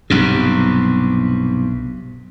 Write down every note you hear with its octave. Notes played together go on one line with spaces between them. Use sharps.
B1 G2 C3